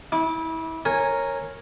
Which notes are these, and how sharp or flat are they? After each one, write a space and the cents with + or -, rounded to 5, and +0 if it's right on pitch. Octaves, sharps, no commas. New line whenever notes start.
E4 -30 D6 +0
A#4 -5 C#5 -10 G#5 +0